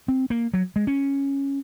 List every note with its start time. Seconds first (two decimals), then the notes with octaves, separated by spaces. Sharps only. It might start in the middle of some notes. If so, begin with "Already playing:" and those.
0.08 C4
0.30 A#3
0.54 F#3
0.76 G#3
0.87 C#4